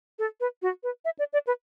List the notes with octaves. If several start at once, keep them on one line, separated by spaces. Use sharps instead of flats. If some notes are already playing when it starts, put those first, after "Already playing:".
A4
B4
F#4
B4
E5
D5
D5
B4